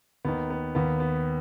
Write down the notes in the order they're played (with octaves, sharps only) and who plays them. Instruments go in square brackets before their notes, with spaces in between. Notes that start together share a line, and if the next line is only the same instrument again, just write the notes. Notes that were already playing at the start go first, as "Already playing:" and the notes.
[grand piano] D#2 D#3 B3
B3
D#2 D#3 B3
B3